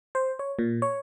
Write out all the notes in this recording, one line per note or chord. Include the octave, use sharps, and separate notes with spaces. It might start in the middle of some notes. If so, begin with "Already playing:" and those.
C5
C#5
A#2
C#5